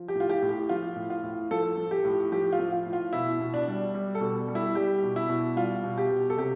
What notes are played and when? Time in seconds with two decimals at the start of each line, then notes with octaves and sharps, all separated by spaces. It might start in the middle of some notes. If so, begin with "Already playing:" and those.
Already playing: F3
0.08 G4
0.15 A2 F4
0.29 G4
0.42 A2
0.49 G4
0.69 F3 F4
0.97 A2
1.10 F4
1.24 A2
1.51 F3 A4
1.77 F3
1.91 G4
2.05 A2
2.32 F3 G4
2.53 F4
2.59 F3
2.72 F4
2.86 A2
2.93 F4
3.13 B2 E4
3.40 B2
3.54 D4
3.68 G3
3.95 G3
4.15 A4
4.21 B2
4.48 G3
4.55 E4
4.75 G3 G4
5.03 B2
5.16 E4
5.29 B2
5.56 G3 F4
5.84 B2
5.97 G4
6.11 B2
6.30 A4
6.37 C3 G4